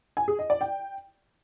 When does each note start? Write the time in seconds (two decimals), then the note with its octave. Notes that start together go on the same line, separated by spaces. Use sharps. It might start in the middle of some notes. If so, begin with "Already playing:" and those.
0.17 G#5
0.28 G#4
0.39 D#5
0.50 D5
0.61 G5